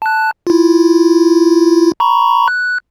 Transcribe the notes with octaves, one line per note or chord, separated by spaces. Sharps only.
A5 F#6
E4 F4
A#5 B5 C#6
F#6